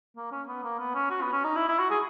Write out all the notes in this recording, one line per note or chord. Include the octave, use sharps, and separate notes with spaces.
A#3
C#4
B3
A#3
B3
C#4
F#4
B3
C#4
D#4
E4
E4
F#4
G#4